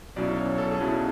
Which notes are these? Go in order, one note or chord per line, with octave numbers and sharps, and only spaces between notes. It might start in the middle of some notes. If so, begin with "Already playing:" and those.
B1 B2 F#3 C#4 E4 D5
C#5
A4
G#4
B1 B2 F#3 C#4 E4 A4